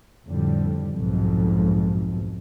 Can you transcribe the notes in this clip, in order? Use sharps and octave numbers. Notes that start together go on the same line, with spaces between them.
F2 A2 D3 G3
B1 F2 G#2 B2